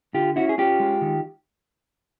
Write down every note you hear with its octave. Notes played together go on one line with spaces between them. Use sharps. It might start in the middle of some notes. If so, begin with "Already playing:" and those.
D3 F4 G4
C#4 E4 F#4
G#4
C#4 F4 G4
G#3
D#3